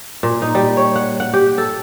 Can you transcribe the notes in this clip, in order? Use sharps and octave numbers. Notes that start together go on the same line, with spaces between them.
A#2
D#4
G3
C#5
F#5
F#5
G4
A4